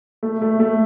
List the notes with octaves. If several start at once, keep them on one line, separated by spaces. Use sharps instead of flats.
A3
A3
A3